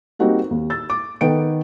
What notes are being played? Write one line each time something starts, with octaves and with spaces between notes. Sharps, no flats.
G3 A#3 C4 D#4 F#4 G4
D#2
E6 A6
D6
D#3 B3 A4 G5 D7